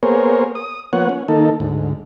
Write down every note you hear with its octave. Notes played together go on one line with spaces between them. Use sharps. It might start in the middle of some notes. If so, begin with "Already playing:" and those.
A#3 B3 G#4 A#4 C5 C#5
D#6
F3 A#3 B3 C#5 F#5
C#4
D#3 A#3 D#4 A4
D2 G#2